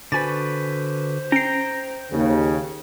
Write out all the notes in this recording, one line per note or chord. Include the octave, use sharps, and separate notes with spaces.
D3 F#4 B4 C5 G#5 A6
C#4 G5 A#5 C7
D#2 C#3